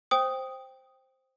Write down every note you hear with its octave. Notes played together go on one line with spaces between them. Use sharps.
C5 G5 D#6